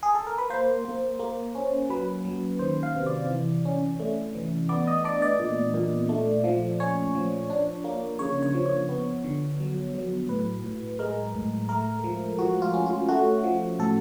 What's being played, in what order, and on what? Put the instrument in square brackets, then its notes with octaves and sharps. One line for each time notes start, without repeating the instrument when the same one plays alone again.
[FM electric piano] G#4
A4
A#4
B4
A#3 C5
A#3
A#3
C#4
F#3 B4
F#3
D#3 C5
F5
C3
D5
E3
C#4
A3
E3
B3 D5
D#5
D4 D5
D5
A#2
A#2
A3
F3
C#4 C#5
F3
D4
A#3
C#3 C#5
C#5
F3
C#5
B3
D3
F#3
F#3
A2 B4
A2
G#3 A#4
A2
A3 A#4
F3
F3 F#4
F4
C#4
F4
A3 F#4
F3
A2 A4